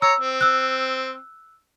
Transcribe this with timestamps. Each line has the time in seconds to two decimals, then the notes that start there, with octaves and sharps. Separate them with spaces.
0.02 C#5 A#5 E6
0.21 C4
0.41 E6 F#6